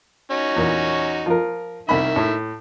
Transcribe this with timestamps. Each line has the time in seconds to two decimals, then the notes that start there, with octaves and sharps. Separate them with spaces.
0.31 C#4 D#4 F#4
0.56 E2 A#2
1.26 F3 A#4
1.89 C2 D#3 E5 B5
2.16 A2